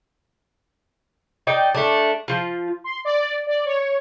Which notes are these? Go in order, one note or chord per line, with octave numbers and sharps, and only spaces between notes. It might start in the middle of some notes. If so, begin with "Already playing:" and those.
D#4 D5 G5
A3 D4
F3 F4
C6
D5
D5
C#5